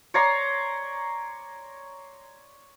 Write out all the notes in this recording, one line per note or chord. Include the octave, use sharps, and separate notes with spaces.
C#5 D5 A#5 C6